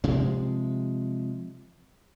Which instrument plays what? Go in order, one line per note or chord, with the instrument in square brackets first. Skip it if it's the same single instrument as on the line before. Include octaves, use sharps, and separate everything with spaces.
[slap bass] C3 F3 G#3